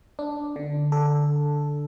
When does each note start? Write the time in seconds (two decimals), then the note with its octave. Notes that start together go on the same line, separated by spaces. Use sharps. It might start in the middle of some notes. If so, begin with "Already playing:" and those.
0.19 D4
0.56 D3
0.92 A4